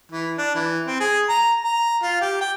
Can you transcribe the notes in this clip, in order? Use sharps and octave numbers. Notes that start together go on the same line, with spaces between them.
E3
D4
E3
C4
G#4
A#5
A#5
F4
G4
G5